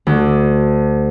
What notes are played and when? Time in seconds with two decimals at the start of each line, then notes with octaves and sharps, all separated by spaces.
0.07 D2